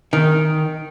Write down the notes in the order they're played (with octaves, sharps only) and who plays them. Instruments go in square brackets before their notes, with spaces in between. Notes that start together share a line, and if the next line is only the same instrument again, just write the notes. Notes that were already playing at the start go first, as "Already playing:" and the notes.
[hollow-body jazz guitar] D#3